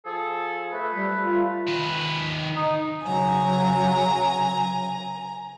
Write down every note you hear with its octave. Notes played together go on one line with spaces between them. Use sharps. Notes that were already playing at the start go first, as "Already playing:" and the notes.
F3 G#4 A4
A3 B4
G3
F4
D#3 B4
D#4
C#3 F#3 G#5 A#5